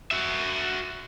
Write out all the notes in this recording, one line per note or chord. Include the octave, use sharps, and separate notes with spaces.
F#4 E5